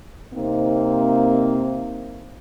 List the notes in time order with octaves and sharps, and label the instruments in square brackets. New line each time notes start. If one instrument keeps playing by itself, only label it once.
[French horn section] C3 A#3 C4 D#4